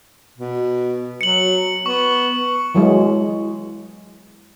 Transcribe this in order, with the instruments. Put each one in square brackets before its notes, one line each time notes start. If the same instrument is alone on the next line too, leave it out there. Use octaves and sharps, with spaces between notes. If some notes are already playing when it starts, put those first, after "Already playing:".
[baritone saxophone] B2
[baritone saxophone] F#3 [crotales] C#7 F#7
[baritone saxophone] B3 [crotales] C#6
[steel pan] E3 F#3 G#3